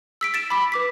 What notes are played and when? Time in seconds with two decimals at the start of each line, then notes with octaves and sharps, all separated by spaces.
0.21 E6 B6 D7
0.34 A6 D7 E7
0.50 B5 D6 B6
0.72 B4 D6 B6